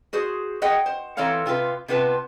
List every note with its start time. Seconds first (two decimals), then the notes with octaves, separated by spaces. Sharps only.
0.13 F#4 G#4 C5
0.62 G#4 D#5 F#5 G5
0.86 C5
1.17 E3 C4 A4 C#5 F5 A#5
1.46 C3 F4 G#4 B4
1.88 C3 B3 F4 B4 A5